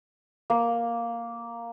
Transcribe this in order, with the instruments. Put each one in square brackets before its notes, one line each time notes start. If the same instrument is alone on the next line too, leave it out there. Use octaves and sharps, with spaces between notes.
[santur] A#3